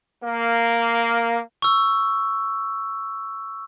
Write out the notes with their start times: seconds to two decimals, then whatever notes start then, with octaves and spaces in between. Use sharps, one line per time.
0.23 A#3
1.62 C#6 E6